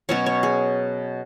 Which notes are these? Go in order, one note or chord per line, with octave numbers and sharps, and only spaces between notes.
B2 F#3 C#4 C#5
C#5
G#4